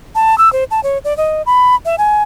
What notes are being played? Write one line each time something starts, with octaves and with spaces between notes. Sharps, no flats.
A5
E6
C5
A5
C#5
D5
D#5
B5
E5
G#5